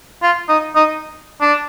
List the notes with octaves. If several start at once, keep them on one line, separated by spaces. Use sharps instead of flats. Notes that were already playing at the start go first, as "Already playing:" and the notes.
F4
D#4
D#4
D4